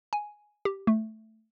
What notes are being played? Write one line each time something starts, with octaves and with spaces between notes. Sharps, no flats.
G#5
G4
A3